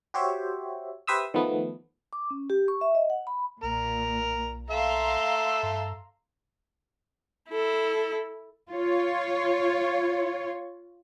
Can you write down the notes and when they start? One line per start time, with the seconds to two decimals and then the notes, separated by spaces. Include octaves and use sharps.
0.14 F#4 G4 C5 C#5 E5
1.07 G4 B4 C5 E5 D#6 E6
1.34 D#3 F3 A3 B3
2.13 D6
2.30 C#4
2.50 G4
2.68 C#6
2.81 E5
2.95 D#5
3.10 F#5
3.27 B5
3.63 B1 A#2 A#4
4.70 A4 E5 F5 A#5 C6
5.63 G2
7.50 E4 A4
8.70 F4 C#5